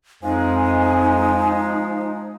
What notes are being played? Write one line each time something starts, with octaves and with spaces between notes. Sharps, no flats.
F2 F3 G#3 D#4 G#5